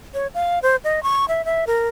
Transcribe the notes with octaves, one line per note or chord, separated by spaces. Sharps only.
C#5
F5
C5
D#5
C#6
E5
E5
A#4